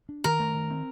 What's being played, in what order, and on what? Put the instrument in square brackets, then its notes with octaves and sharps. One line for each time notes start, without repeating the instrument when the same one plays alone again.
[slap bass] D4
[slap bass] D#3 [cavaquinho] A#4
[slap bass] A3
D#3
C4